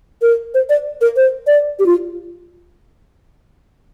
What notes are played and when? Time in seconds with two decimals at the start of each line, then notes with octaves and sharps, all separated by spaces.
0.22 A#4
0.54 C5
0.69 D5
1.01 A#4
1.17 C5
1.47 D5
1.79 G4
1.86 F4